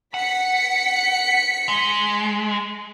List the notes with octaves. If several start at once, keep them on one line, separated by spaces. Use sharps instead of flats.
F#5 B6 C#7
G#3